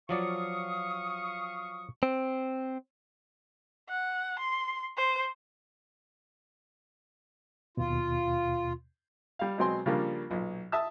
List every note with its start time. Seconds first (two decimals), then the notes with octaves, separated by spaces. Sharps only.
0.09 F3 F#3 D5 F5 C#6 D#6
2.03 C4
3.89 F#5
4.39 C6
4.97 C5
7.77 D#2 B2 F4
9.39 G3 F5
9.58 B2 F#3 G#3 C4 G#5 C6
9.86 C#3 F3 G3 A#3 D4
10.30 B1 A#2
10.72 E5 A5 D#6 E6